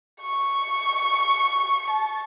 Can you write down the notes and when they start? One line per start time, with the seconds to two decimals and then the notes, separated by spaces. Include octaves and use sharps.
0.22 C#6
1.89 A5